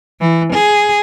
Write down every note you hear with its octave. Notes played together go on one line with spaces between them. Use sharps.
E3
G#4